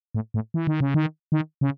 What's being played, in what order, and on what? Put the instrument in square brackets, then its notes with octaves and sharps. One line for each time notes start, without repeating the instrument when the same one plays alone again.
[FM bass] A2
A2
E3
D#3
C#3
D#3
D#3
C#3